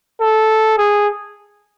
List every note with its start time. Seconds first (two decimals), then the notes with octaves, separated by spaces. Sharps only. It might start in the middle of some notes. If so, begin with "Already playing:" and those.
0.21 A4
0.78 G#4